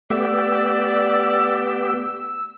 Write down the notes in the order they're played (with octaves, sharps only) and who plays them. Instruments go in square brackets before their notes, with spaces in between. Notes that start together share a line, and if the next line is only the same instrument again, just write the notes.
[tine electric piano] A3 [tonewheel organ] B3 G4 [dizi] D5 [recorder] E6